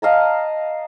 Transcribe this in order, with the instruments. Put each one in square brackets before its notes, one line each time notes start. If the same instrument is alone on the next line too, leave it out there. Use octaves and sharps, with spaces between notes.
[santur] D#5 F5 A5 A#5